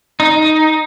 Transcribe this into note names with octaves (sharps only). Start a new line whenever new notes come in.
D#4